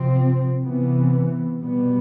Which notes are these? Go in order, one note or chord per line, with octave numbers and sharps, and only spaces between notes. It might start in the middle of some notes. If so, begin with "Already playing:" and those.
Already playing: C3 F3 C4
C3 E3 B3
B2 G3 B3